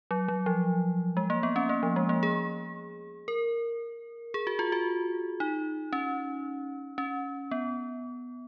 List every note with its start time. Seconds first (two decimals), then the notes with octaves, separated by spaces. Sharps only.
0.11 F#3
0.28 F#3
0.46 F3
1.17 G#3
1.30 A#3
1.43 B3
1.56 C#4
1.69 A#3
1.83 F3
1.96 G#3
2.09 A#3
2.23 G#4
3.28 A#4
4.34 G#4
4.47 F#4
4.59 F4
4.72 F#4
5.40 D#4
5.93 C#4
6.98 C#4
7.51 B3